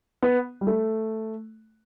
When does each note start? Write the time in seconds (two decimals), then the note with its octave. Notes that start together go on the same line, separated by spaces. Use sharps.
0.23 B3
0.61 G3
0.67 A3